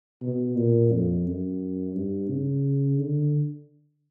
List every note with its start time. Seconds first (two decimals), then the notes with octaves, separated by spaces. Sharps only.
0.22 B2
0.56 A#2
0.92 F2
1.26 F#2
1.95 G2
2.30 C#3
2.99 D3